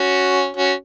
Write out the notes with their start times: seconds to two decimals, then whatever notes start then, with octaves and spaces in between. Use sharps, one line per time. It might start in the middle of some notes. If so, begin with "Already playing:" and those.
Already playing: C#4 F#4
0.57 C#4 F#4